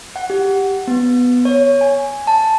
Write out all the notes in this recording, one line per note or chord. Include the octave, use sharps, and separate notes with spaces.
F#5
G4
B3
C#5
G#5
A5